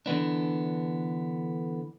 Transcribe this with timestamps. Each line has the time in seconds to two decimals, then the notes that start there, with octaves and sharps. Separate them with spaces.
0.06 D3 E3 B3 D4